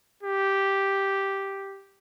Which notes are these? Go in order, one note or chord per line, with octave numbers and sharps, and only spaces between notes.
G4